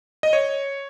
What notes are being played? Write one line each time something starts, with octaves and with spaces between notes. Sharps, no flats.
D#5
C#5